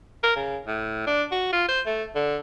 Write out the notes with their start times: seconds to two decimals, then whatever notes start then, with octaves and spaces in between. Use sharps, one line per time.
0.23 A#4
0.36 C#3
0.67 A2
1.07 D4
1.32 F#4
1.52 F4
1.68 C5
1.86 A3
2.15 D3